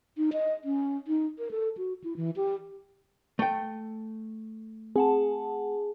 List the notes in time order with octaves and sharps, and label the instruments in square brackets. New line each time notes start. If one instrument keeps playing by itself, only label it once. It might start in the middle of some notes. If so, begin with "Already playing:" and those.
[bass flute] D#4
D#5
C#4
D#4
A#4
A4
F#4
E4
E3
G4
[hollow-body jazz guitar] A3 G5
[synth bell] C4 F#5 A5 [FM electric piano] G#4